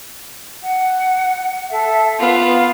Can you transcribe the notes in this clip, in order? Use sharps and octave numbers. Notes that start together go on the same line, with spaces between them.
F#5
A4 E5
B3 F4 F5